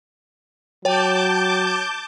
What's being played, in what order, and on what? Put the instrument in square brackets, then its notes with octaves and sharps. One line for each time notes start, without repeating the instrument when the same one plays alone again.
[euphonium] F#3 [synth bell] C#5 G5 [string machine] A5 D6 G6